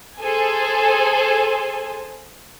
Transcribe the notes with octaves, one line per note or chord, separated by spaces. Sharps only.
G#4 A4 C5 G#5